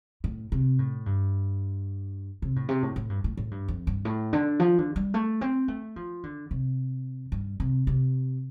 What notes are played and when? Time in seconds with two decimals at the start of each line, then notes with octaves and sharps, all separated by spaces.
0.24 A2
0.52 C3
0.79 A2
1.06 G2
2.42 C3
2.56 A2
2.69 C3
2.83 A2
2.96 A2
3.10 G2
3.24 A2
3.37 A2
3.51 G2
3.68 F2
3.87 G2
4.05 A2
4.33 D3
4.60 F3
4.78 D3
4.96 G3
5.14 A3
5.41 C4
5.68 A3
5.96 F3
6.23 D3
6.51 C3
7.32 G2
7.60 C3
7.87 C3